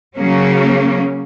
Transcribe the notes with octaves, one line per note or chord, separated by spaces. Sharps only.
C#3 F#3 A#3 C#4